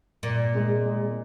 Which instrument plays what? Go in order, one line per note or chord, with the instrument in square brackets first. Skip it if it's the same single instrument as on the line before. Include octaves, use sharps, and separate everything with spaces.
[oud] A#2
[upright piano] G#3 G#4
G#3 G#4